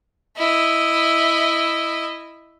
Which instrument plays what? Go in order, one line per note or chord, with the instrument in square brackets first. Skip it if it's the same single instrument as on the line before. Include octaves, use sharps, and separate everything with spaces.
[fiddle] E4 D#5